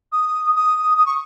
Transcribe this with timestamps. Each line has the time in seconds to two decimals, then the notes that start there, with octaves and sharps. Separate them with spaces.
0.12 D#6
0.55 D#6
0.98 D#6
1.06 C#6